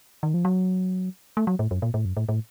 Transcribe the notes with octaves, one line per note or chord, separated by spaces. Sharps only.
D#3
F3
F#3
A3
F#3
A2
F#2
A#2
A2
F#2
A2
A2